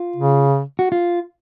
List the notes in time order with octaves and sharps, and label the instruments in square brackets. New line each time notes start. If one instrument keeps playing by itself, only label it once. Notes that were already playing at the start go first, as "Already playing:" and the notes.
Already playing: [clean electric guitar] F4
[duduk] C#3
[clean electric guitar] F#4
F4